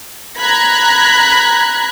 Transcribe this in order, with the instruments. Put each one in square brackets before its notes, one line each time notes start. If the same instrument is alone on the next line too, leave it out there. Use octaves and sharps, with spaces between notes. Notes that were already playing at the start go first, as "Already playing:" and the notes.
[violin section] A#5 B5 F#6 G#6 B6